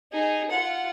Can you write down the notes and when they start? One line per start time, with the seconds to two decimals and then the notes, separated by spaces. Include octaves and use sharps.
0.12 D#4 G#4
0.50 F4 F#5